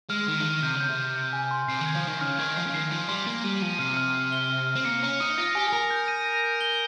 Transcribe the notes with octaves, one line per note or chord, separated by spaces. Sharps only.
G#3 F6
D#3 F6
F3
D#3 D#7
C3 G6
C#3
G6
C3
G6
G6
G#5
C6
C3 C7
D#3
G#6
F3
D#3 F6
C#3 F6
D#3 G#6
F3 C7
C#3
D#3 C7
F3 C7
G3 C6
A#3 F6
G3 D#7
F3 D#7
C3 F6
F6
C7
G7
F6
F6
C4
A#3 C#7
C#4 C#7
D#4 D#6
F4 A#6
G4 G#5
G#4
A#4 A#6
G6
D#7
A#6
G6
G7